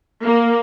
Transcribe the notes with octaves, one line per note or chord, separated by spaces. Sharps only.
A#3